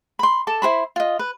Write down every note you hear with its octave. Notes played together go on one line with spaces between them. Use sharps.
B5 C6
A4 A5 D6
E4 G#4 C5 B5
F4 D#5
B4